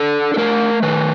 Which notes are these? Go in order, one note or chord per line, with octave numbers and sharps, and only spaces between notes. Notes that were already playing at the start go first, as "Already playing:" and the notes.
Already playing: D4 A4
A4
A3 A#4
D#3 B4